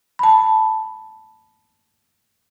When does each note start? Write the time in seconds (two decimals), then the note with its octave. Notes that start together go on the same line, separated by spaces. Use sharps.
0.19 A5 B5